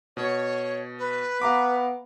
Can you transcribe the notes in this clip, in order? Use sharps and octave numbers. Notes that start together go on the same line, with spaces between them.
B2 C#5
B4
B3 F5 A#5 D6